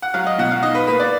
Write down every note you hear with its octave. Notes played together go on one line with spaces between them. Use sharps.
F#5
F#3 F5
D#5
B2 F#5
F5
D#4 D#5
B4
A#3 B4
D5